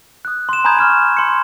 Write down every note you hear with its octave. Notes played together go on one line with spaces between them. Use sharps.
D#6 F#6
C6 E7
G#5 A#5 B5 D#6 G6 G#6
C#6 F6 E7
C6 C#7